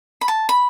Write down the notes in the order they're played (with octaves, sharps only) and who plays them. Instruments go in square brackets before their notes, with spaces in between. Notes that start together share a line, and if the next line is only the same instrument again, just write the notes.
[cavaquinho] B5
A5
B5